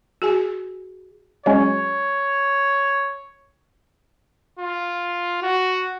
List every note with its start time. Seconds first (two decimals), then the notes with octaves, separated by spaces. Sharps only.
0.22 F#4 G#4 G#5
1.46 F#3 G#3 C#4 C#5
4.59 F4
5.42 F#4